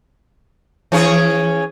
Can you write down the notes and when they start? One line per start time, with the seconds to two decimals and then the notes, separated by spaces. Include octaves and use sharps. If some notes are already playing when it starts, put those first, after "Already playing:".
0.92 E3 C#4 G#4